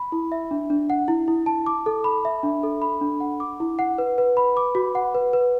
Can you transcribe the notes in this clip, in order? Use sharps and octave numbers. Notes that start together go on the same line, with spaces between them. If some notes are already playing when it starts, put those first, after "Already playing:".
Already playing: B5
E4
E5
D4
D4
F#5
E4
E4
A5
D6
A4
B5
E5
D4
A4
B5
D4
F#5
D6
E4
F#5
B4
B4
B5
D6
F#4
F#5
B4
B4